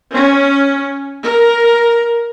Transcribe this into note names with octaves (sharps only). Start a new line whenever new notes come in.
C#4
A#4